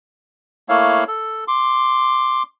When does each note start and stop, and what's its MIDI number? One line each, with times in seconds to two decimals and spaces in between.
0.69 1.04 57
0.69 1.04 58
0.69 1.04 64
0.69 1.04 73
0.69 1.04 77
1.08 1.44 69
1.48 2.43 84
1.48 2.43 86